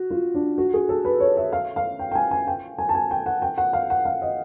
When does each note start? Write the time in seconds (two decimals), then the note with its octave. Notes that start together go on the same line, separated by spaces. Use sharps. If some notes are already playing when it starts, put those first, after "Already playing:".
Already playing: F#4
0.10 F4
0.35 D4
0.58 F#4
0.74 G#4
0.89 A4
1.05 B4
1.20 C#5
1.37 E5
1.53 F5
1.76 F5
1.99 G5
2.11 G5
2.15 G#5
2.31 G#5
2.47 G5
2.78 G#5
2.89 A5
2.95 G#5
3.11 G5
3.26 F#5
3.42 G5
3.58 F#5
3.73 F5
3.90 F#5
4.05 F5
4.22 D#5